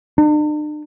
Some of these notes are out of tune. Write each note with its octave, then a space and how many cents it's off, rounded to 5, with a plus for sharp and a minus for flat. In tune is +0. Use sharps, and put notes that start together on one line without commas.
D4 +45